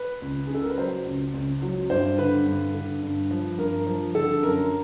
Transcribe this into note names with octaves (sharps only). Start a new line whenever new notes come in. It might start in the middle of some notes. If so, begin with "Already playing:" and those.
Already playing: B4
C#2
G#4
C#3 A4
A#4
B4
F#3 C5
C#2
C#2
F#3
G2 C5
D3 B4
G2
D3
G2
F3
G2 A#4
F3
D3 A4
F#2 A#4